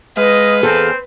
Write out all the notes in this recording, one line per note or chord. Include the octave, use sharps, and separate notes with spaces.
G#3 B4 D#5 F5
E2 C4 G#4 A4 F5